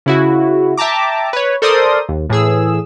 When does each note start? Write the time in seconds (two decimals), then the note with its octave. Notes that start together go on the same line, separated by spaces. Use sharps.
0.06 C#3 E4 F#4
0.77 E5 G5 A5 A#5 D6
1.33 B4 C#5
1.62 A4 A#4 C5 D5 C6 D#6
2.09 D#2
2.30 A2 E3 G#4 E6